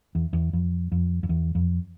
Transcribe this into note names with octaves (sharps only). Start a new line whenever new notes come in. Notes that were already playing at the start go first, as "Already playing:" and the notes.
E2
E2
F2
F2
F2
E2
F2